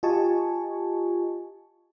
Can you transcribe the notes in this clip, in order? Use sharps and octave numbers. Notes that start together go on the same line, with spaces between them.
F4 G4 D#5 G#5 A5 C#6